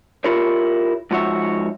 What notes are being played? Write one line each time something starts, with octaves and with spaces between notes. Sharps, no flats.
E4 F4 G4 A#4 C#5
G#2 F3 F#4 C#5 E5